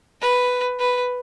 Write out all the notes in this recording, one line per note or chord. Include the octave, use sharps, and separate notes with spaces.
B4
B4